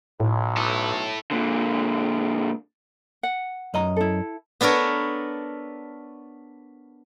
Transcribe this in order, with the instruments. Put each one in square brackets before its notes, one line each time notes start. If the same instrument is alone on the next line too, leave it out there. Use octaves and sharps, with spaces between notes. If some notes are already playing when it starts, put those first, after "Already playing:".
[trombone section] B1 [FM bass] A2
[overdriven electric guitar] E4 A4
A#2 D3
[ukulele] F#5
[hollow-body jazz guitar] F#2 D#5 A#5
[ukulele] E4 A4
[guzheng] B3 D4 A4 A#4 C#5